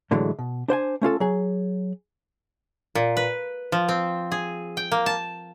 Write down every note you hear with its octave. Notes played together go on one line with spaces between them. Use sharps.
A2 D3 E3 F#3 G#3 A3
B2
D4 C5 G5 G#5
A3 C#4 F4 A4
F#3 G#4
A#2
B4
F3
C4
G#4
G5
A#3
A5